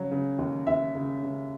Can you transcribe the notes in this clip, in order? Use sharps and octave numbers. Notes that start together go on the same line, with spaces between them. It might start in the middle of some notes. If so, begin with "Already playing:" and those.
Already playing: C#3 F#3
C#3
D#2
D#2 E5
C#3
C#3